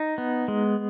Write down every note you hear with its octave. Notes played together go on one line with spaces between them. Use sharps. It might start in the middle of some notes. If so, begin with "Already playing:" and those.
Already playing: D#4
B3
G#3